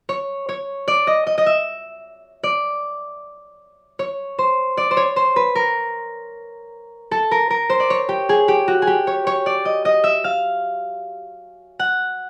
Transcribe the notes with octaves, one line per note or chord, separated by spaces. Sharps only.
C#5
C#5
D5
D#5
D#5
D#5
E5
D5
C#5
C5
D5
C5
C#5
C5
B4
A#4
A4
A#4
A#4
C5
D5
C#5
G4
G#4
G4
F#4
G#4
G4
C#5
C#5
D5
D#5
D#5
E5
F5
F#5